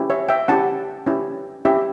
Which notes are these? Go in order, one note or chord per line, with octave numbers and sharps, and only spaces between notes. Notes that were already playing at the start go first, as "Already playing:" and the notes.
Already playing: C#4 E4 G4
C#5 E5
E5 G5
C#4 E4 G4 F#5 A5
C#4 E4 G4
C#4 E4 G4 E5 G5